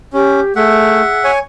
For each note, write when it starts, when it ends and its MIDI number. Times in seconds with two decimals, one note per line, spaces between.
0.13 0.40 61
0.13 0.52 67
0.56 1.01 57
0.56 1.26 68
0.56 1.31 76
0.56 1.31 78
1.24 1.39 73
1.24 1.39 80